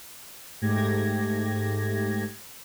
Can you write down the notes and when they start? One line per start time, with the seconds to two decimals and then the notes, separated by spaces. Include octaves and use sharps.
0.62 G#2 A3 G4 G#6 A#6